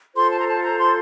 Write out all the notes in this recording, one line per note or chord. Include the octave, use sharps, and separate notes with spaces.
F4 A4 C5 C6
A5
A#5
A5
A#5
C6